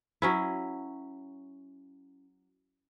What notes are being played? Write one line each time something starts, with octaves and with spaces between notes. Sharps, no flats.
F#3 C#4 E4